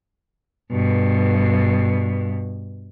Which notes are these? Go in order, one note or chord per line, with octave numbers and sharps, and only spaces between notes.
G2 B2